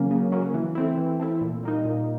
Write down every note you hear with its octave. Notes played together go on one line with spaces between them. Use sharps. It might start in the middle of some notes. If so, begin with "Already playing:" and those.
Already playing: C#3 F#3 A#3 C#4
C#3
F#3 A#3 C#4
E3
A3 C4 E4
E3
A3 C4 E4
A#2
G3 A#3 D#4
A#2